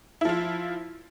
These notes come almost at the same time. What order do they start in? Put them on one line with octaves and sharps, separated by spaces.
E4 F3 F4